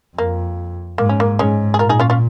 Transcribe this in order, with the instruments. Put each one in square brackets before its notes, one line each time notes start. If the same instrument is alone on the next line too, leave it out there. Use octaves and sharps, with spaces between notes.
[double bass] F2 [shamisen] A#3
[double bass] G#2 [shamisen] A#3
[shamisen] C#4
A#3
[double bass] G#2 [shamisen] G#3 C#4
[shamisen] G#4
[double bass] A#2 [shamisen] F4 A#4
[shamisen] D#4 G#4
C#4 F4
C#4 F4